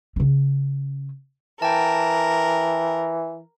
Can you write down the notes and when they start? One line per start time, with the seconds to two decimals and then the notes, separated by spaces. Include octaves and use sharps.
0.16 C#3 C#4
1.62 E3 A#4 G5 A5